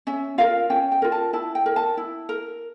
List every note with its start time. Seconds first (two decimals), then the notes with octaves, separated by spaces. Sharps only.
0.07 C#4 E5
0.38 F4 A#4 F5
0.70 C#4 G5
0.92 G5
1.02 F4 A#4
1.12 A5
1.33 E4 A5
1.55 G5
1.66 A#4
1.76 A5
1.97 E4
2.29 A#4